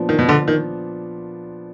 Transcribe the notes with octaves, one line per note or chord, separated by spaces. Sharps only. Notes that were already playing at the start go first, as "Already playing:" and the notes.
Already playing: A#2 F3 B3 D4
D#3
B2
D3
D#3